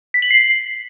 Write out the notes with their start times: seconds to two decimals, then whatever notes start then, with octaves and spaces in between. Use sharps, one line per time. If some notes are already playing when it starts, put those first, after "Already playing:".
0.14 B6
0.22 F#7
0.31 C7